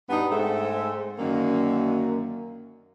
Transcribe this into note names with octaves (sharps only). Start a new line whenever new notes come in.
G2 B2 B3 D4 D#4
G#2 A3 C4 A4
F#2 D3 D#3 A#3